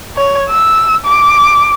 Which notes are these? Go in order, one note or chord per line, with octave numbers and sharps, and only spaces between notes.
C#5
E6
D6